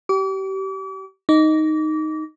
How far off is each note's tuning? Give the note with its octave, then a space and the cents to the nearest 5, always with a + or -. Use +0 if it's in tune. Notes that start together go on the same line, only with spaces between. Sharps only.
G4 -30 D6 -40
D#4 +0 D6 -30